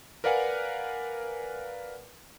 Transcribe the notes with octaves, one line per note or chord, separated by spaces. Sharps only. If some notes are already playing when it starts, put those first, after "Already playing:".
A#4 B4 D5 F5 F#5 G#5